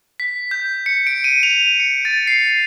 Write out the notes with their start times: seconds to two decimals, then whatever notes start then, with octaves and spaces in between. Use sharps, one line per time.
0.20 B6
0.51 G6
0.86 C#7
1.07 D7
1.24 D#7
1.43 F7
1.80 C#7
2.05 A6
2.27 C7